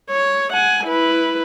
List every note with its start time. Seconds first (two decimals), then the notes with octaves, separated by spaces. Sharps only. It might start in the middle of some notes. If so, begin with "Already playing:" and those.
0.10 C#5
0.53 F#5 G#5
0.86 E4 B4